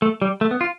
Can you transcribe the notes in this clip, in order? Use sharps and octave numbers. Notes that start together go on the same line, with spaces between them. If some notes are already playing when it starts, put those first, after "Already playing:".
A3
G3
A3
B3
F4